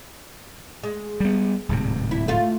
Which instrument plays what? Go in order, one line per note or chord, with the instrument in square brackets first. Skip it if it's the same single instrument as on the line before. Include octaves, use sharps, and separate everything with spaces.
[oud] G#3
[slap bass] G3 B3
D1 G#2 C3
[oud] E4
A3 F4